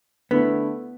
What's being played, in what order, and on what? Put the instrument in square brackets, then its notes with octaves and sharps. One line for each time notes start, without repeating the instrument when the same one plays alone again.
[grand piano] D3 A3 E4 [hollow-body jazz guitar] B3